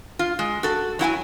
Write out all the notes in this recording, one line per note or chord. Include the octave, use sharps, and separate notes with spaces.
F4
G#3
F#4 A4
F#3 E4 F#5 G#5